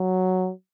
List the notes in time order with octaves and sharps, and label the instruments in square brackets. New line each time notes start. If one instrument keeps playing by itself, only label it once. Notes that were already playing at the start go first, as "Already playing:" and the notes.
Already playing: [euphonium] F#3